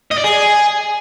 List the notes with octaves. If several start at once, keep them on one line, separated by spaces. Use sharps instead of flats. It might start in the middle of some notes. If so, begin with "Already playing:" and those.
D#5
D5
G#4